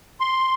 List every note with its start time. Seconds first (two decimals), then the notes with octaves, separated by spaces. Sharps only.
0.20 C6